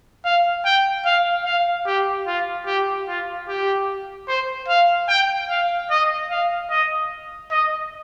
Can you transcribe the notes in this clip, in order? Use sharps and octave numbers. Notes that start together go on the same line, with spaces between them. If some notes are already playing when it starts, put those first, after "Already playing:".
F5
G5
F5
F5
G4
F4
G4
F4
G4
C5
F5
G5
F5
D#5
F5
D#5
D#5